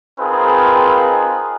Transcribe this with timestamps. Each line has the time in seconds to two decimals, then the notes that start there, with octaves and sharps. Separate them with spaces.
0.20 C4 D#4 F4 G#4 A#4 B4